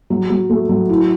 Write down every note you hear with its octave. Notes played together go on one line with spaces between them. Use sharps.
F#3
F#3
A3
F#3
E4